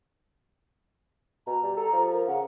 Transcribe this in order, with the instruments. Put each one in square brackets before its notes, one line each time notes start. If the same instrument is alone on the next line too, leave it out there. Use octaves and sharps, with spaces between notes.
[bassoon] B2 [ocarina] A#5
[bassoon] G3
[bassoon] A4 [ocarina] A#5
[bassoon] F3
[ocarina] A#4
[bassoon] C#3 [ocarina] F#5